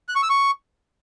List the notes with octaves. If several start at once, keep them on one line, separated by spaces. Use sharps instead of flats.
F#6
C#6
E6
C#6